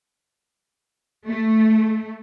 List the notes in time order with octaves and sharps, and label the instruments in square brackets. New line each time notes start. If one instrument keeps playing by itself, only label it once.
[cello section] A3